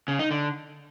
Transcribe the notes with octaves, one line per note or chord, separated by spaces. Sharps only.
C#3
D#4
D3